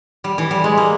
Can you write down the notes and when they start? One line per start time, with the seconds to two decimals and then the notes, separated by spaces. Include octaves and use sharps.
0.24 G3
0.38 E3
0.51 G3
0.64 G#3
0.77 A#3